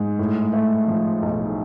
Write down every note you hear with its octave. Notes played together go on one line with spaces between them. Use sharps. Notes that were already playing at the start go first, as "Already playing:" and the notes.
Already playing: G#2
A2
A3
F3
B1